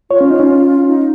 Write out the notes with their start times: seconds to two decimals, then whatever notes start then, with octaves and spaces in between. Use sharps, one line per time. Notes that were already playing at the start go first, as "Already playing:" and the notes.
0.11 F4 C#5
0.21 C#4
0.30 D#4
0.40 C#4
0.88 D#4